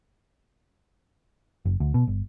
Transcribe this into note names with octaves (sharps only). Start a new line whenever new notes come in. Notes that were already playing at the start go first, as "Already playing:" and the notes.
F#1
D2
B2
G1